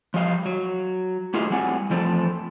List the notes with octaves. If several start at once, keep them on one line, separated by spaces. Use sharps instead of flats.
F3 G3 D#5 F5
F#3
A3 E4 F4 G4 G#4 D#5
F#3 G3 C4 F#5 G#5
E2 F3 A3 C4